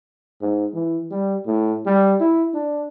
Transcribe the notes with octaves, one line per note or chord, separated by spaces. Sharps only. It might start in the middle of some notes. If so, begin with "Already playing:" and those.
G#2
E3
G3
A2
G3
E4
D4